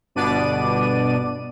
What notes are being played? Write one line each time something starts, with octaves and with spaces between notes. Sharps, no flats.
G1 B2 B3 D4 D5 D#7